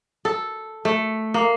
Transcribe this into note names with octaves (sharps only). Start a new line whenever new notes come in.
A4
A3
A#3